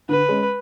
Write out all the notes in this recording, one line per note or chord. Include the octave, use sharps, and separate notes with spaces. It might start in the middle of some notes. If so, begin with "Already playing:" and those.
D3 B4
G#3 C#4